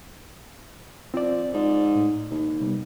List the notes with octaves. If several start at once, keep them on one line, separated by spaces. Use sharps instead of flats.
F3 C4 D5
G#2 D5
A2
D#2 A#2
C3 G3 B3